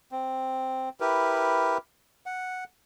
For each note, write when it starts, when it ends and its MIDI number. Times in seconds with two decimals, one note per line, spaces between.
0.12 0.89 60
1.00 1.78 64
1.00 1.78 67
1.00 1.78 70
1.00 1.78 71
2.26 2.64 78